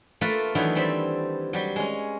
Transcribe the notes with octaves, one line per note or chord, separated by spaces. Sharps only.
A3 A#3 F4 A4 B4
D#3 E3 F#3 B3 D4 E4
G3 C4 A4 B5
F#3 G3
G#3 C#4